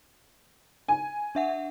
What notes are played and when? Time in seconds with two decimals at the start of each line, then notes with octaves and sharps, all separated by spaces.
0.88 G#5
1.35 D4 E5 F#5